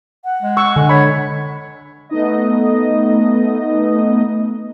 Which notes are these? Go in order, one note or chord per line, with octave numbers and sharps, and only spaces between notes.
F#5
G#3
C#6 E6
D3 G#5
C#5 B5
A3 B3 D#4 D#5